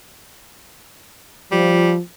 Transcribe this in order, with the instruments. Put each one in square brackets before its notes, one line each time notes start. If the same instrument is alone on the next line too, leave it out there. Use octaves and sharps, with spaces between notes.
[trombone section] F3 [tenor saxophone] G3